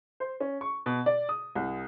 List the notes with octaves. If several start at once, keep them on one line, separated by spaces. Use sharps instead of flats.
C5
C#4
C#6
B2
D5
D#6
C2